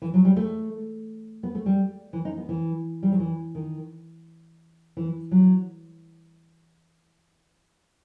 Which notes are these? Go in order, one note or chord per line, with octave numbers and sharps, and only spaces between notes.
E3
F#3
G3
A3
B3
A3
G3
E3
D#4
B3
E3
G3
F#3
E3
D#3
E3
F#3